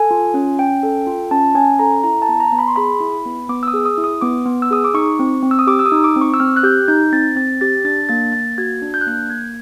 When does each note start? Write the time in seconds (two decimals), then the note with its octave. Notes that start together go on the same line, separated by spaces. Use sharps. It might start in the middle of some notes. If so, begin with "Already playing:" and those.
Already playing: A4 G#5
0.11 F4
0.34 C#4
0.59 C#4 G5
0.83 A4
1.07 F4
1.31 C#4 A5
1.55 C#4 G#5
1.79 A4 A#5
2.04 E4 A#5
2.22 A5
2.29 B3
2.40 A#5
2.52 B3
2.59 B5
2.68 C6
2.76 G#4 B5
3.00 E4
3.26 B3
3.49 B3 D6
3.63 E6
3.68 D#6
3.74 G#4
3.86 D#6
3.98 E4
4.04 D#6
4.21 B3 D6
4.46 B3
4.62 E6
4.71 G#4 D#6
4.84 D6
4.94 D#4 C#6
5.19 C4
5.43 C4
5.51 E6
5.59 D#6
5.67 G4 D6
5.79 E6
5.86 D#6
5.92 D#4
6.04 D6
6.16 C4
6.21 C#6
6.34 E6
6.40 C4 F6
6.56 F#6
6.63 G4 G6
6.88 D#4 G6
7.12 C4 A6
7.36 C4 A6
7.61 G4 A6
7.85 D4 A6
8.09 A#3 A6
8.33 A#3 A6
8.58 F#4 G#6
8.82 D4
8.94 G6
9.01 F#6
9.07 A#3 G6
9.30 A#3 G#6